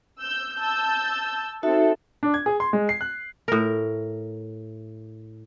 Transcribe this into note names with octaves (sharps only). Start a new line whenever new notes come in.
E6 G6
A5 E6 G6
C4 D#4 F#4 A4 E5
D4
G#6
G#4
C6
G#3
C7
F#6
A2 A#4